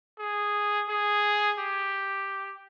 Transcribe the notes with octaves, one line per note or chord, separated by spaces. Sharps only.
G#4
G#4
G4